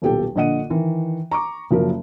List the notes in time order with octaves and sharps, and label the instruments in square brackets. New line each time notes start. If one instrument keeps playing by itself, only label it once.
[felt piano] D#1 B1 G4 A4 G5
A#1 D3 D#5 F#5 D#7
D#3 E3
A#5 C#6 D6
F#1 F3 F#3 A#4